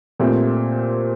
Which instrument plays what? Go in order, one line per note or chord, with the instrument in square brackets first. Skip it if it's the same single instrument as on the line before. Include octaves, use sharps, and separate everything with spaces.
[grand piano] A#2 A3 C4 G4